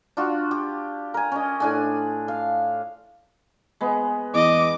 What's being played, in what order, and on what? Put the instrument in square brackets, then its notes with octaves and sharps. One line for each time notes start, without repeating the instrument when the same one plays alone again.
[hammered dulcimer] D4 F4 F#4
G4
A#4 G#5
C#4 D#5
A2 D4 G#5
F5
G#3 B3
[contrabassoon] E2 [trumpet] D#5 [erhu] D6